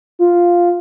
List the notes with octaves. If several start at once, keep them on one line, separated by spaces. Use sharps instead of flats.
F4